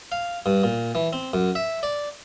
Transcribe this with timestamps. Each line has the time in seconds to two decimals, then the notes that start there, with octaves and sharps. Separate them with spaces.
0.12 F5
0.46 G2
0.63 A#2
0.95 E3
1.13 C4
1.33 F#2
1.55 E5
1.83 D5